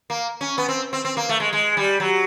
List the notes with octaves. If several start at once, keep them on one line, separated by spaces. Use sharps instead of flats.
A#3
C#4
B3
C4
C4
C4
A#3
A3
G#3
G#3
G3
F#3